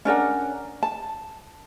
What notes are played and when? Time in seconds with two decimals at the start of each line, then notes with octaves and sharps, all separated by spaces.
0.05 C#4 D4 A#4 F#5
0.83 A5